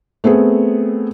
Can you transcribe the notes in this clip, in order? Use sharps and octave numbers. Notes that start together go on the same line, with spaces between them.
A3 B3 C4 G#4